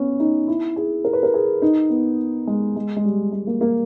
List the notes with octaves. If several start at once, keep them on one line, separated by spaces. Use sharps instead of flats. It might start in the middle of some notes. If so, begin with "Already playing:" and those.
Already playing: B3 C#4
D#4
E4
G#4
A#4
B4
A#4
G#4
D#4
B3
G#3
G#3
G#3
G3
G#3
A#3
A#3